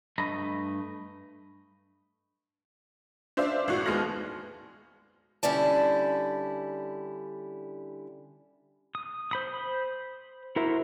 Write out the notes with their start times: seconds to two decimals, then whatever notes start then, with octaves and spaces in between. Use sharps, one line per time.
0.18 G2 A3 D#5 A#5 B5
3.37 D4 C5 D5 E5 F5
3.68 G#1 A2 F#4
3.86 D#2 G#3 B3 F6 A#6 F#7
5.43 D3 G3 C#4 E4 D5 A5
8.95 D#6
9.31 C5 B5 D#6
10.56 E4 F#4 A#4 C5 E5